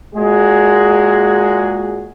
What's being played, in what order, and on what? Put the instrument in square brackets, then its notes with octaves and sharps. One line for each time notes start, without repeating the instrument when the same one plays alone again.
[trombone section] A#2 G#3 F#4 G#4